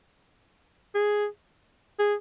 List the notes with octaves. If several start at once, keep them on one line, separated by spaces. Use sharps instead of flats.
G#4
G#4